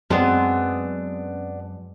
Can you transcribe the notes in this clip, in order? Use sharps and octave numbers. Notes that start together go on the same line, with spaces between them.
F#2 G#3 B3 C4 D4